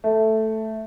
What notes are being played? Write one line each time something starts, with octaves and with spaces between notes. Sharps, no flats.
A3